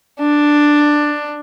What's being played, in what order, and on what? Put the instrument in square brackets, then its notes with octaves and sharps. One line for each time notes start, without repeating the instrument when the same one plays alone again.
[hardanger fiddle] D4